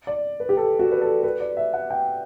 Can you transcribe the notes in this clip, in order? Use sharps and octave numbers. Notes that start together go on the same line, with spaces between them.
D5
B4
G4
A4
F#4
B4
A4
B4
D5
E5
F#5
G5